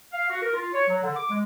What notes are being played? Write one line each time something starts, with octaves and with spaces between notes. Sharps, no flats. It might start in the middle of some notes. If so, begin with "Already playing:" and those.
F5
F#4
A#4
F4
C#5
F#3
D3
D6
G#3